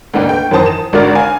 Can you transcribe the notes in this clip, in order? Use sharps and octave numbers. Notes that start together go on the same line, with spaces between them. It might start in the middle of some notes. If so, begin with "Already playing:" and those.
D2 G#2 A#3 D4 B4 G5
A3 G5
F#2 D#3 E3 C5 A5 D#6
E7
G#1 D3 F#4 A#4 D5 F6
F5 G#5